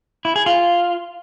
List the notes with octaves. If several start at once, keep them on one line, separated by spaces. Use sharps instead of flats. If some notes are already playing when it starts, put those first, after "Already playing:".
E4
G#4
F4